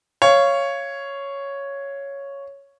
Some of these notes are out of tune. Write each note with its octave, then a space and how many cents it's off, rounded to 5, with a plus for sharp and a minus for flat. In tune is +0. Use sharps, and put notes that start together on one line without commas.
C#5 +0 F5 -20